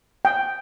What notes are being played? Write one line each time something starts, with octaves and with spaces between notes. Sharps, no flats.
G5